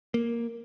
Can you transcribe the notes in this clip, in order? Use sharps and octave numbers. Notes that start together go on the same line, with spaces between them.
A#3